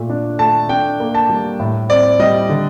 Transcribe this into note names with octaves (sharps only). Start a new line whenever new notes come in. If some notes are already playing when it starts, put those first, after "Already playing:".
Already playing: A#2 A3
D4
A3 A5
D4 G5
A#3
A5
G3
A2
C4 D5
G3 D#5
D3